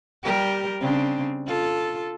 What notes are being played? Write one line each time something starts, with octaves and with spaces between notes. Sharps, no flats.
G3 G4 A#4
C#3 C4 D4
F4 A4